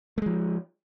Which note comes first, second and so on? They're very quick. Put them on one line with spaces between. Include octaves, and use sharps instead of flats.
A3 G#3 F3